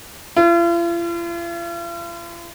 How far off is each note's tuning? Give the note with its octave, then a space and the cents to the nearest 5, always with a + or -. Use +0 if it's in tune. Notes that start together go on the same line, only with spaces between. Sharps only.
F4 -45